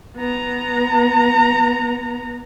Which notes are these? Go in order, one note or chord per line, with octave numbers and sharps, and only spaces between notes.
B3 A#5